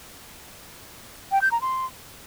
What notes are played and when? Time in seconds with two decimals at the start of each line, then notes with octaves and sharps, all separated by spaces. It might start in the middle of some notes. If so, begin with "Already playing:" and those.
1.32 G5
1.42 G6
1.52 A#5
1.62 C6